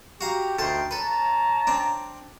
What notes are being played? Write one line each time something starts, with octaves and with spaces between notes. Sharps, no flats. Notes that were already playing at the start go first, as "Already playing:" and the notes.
F#4 G4 F5 A#5
D2 A3 D#4 G5 A5 C6
C#4 A4 B4 A5 A#5
C4 D4